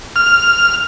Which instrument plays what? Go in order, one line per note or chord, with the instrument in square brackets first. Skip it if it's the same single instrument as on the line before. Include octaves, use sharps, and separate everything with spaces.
[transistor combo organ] F6